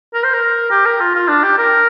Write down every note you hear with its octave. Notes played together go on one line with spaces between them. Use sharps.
A#4
C5
A#4
G4
A#4
F4
F4
D4
G4
A#4